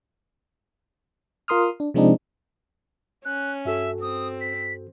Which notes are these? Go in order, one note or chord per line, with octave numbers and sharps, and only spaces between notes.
F4 A#4 C6 D#6 F6
D4
C3 F3 G#3 C4 D4 D#4
C#4 F#6
G2 F#4 A4 E5
C4 D#6
B6